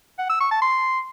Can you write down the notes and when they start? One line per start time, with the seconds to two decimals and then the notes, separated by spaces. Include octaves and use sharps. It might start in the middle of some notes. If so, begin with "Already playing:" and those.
0.19 F#5
0.30 E6
0.40 C#6
0.51 A5
0.62 C6